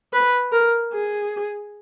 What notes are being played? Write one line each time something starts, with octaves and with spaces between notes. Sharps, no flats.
B4
A#4
G#4